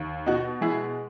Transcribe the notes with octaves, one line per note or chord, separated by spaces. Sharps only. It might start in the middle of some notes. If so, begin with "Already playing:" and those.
Already playing: D#2
B2 D#4 F#4
G#3 E4 G#4